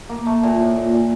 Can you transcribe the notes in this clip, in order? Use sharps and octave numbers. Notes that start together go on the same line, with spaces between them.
A#3
A3
A#2
A2
A#2
A#2